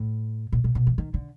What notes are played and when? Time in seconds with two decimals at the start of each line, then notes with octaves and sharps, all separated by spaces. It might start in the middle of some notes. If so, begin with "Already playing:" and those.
Already playing: A2
0.53 A#2
0.64 B2
0.75 B2
0.87 E3
0.98 D#3
1.14 D3